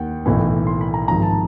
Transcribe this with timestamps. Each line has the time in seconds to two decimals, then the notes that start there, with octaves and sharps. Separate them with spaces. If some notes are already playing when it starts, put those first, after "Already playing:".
Already playing: D#2 D#3 F#5 G5
0.26 B1 A2 E3
0.67 C6
0.81 B5
0.94 A#5
1.08 G#1 G#2 F3 A#5
1.22 A5